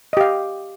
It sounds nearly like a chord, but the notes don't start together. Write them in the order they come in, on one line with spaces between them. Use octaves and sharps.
D#5 G4 F5